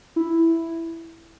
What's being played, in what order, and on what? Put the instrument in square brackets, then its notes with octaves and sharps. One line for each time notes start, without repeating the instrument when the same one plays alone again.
[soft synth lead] E4